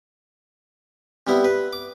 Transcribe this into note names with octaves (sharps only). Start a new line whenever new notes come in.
C3 G3 B3 E4
B4
D6